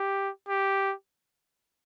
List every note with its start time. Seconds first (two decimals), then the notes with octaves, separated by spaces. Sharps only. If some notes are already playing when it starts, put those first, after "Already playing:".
Already playing: G4
0.49 G4